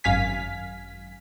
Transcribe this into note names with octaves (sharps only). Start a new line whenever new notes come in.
G#1 F#2 F5 G#5 B6